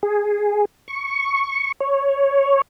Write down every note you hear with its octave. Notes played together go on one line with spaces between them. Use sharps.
G#4
C#6
C#5